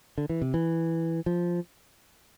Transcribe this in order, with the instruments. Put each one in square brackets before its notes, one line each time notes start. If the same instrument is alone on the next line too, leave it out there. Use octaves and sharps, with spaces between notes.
[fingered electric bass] D3
E3
C3
E3
F3